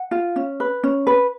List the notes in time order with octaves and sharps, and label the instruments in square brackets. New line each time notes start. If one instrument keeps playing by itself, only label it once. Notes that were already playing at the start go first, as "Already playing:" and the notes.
Already playing: [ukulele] F#5
F4
C#4
B4
C#4
B4